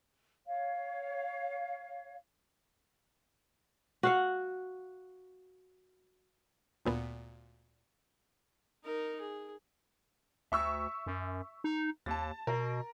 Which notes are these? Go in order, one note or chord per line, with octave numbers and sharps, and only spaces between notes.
C#5 F5
F#4 F5 F#5
D2 A#2 B3
D#4 A#4
G#4
D2 E5 C#6 E6
F#2
D#4
D#2 A5 A6
B2 A#4